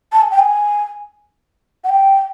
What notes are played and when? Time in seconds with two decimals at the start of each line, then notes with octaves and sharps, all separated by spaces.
0.12 A5
0.22 G#5
0.31 G5
0.39 G#5
1.84 F#5
1.89 G5